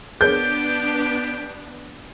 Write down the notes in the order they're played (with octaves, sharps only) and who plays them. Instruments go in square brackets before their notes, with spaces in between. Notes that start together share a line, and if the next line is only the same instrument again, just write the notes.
[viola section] B3 D4 [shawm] G4 [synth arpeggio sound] G#4 A#4 C#5 [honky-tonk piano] G6